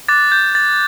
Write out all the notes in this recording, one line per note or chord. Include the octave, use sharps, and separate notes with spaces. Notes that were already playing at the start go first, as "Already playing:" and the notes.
D6 F#6 A6
G6
A6